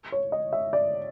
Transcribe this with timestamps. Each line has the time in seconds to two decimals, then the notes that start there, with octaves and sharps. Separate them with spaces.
0.12 C#5
0.32 D#5
0.53 E5
0.73 D5